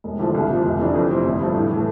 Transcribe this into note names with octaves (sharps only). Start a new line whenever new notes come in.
E1
E2 D3 F3 A3
C2
A#2 F3
F1
F2 E3 A3 D4
F2
C3 G3 C4 E4
G1
G2 F3 A3
A2
E3 A3